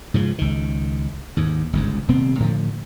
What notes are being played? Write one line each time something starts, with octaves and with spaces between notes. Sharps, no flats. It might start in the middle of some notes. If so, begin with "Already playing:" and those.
G#2 C#3 F3
C#2 D#3
D#2 G#2
G1 C#2 G#2
D#1 C3 B3 C4
A2 D3 F3